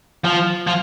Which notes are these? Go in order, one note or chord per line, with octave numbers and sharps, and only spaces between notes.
F3
F3